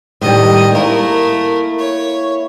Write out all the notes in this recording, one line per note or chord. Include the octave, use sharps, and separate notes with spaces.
A2 D#3 G3 D#5
A3 A#3 E4 A#4
C#5